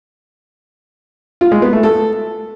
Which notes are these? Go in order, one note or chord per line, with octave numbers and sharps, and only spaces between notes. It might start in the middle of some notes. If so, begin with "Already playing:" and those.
F4
G#3
B3
A3
A4